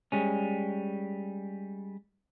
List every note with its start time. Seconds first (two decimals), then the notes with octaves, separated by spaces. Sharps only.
0.12 G3 G#3 C#4